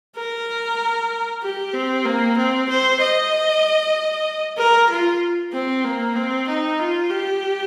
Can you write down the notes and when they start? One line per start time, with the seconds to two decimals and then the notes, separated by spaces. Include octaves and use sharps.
0.17 A#4
1.43 G4
1.74 C4
2.05 A#3
2.37 C4
2.69 C5
3.01 D#5
4.58 A#4
4.90 F4
5.52 C4
5.84 A#3
6.16 C4
6.48 D#4
6.79 F4
7.10 G4